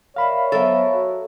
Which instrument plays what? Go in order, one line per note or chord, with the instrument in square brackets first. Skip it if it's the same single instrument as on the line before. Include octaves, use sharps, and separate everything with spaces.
[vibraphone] A#4 D5 E5 [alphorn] C#5 [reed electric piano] F5 B5
[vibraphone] F#3 B3 C5 [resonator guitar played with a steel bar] A4 A#4 E5
[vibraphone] F#4